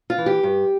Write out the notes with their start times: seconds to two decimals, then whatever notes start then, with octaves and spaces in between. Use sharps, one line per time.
0.10 F4
0.18 E3
0.26 G4
0.43 G2